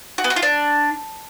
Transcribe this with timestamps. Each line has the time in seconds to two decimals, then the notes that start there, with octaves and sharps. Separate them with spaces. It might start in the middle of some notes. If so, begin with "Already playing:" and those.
0.18 F#4
0.24 B3
0.30 F#4
0.36 F4
0.42 D4